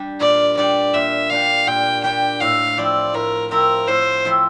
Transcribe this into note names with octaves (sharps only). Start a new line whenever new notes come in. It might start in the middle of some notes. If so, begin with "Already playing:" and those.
Already playing: G3 D4 G4
A#2 D5
G3 D4 G4 D5
A#2 E5
G3 D4 G4 F5
A#2 G5
G3 D4 G4 G5
A2 F5
F3 C4 E4 D5
A2 A#4
F3 C4 E4 A#4
A2 C5
F3 C4 E4